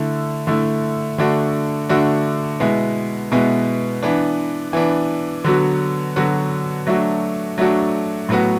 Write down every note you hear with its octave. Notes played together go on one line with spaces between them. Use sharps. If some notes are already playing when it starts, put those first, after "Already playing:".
Already playing: D3 A3 E4
D3 A3 E4
D3 A3 D4 F#4
D3 A3 D4 F#4
B2 G#3 B3 E4
B2 G#3 B3 E4
E3 B3 D4
E3 B3 D4
D3 F#3 B3 F#4
D3 F#3 B3 F#4
F#3 A3 D4 F#4
F#3 A3 D4 F#4
A2 F#3 B3 F#4